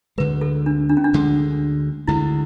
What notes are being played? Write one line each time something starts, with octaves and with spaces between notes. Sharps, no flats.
D2 D3 G#3 B4
A4
D4
D4
C#4
D4
D2 D3 G#3
D2 D3 G#3 E4